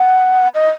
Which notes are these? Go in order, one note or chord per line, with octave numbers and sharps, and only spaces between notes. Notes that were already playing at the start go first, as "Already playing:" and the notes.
Already playing: F#5
D#5